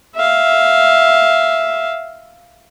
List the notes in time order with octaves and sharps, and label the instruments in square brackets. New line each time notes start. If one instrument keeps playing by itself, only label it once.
[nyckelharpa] E5 F5